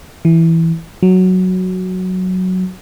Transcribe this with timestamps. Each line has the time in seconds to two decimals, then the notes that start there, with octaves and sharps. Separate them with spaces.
0.25 E3
1.03 F#3